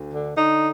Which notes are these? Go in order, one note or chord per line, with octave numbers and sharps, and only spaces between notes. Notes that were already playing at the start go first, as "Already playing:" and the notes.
Already playing: D2
D3
D3 D#4